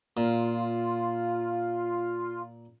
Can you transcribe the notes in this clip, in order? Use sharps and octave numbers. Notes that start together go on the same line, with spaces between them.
A#2 F4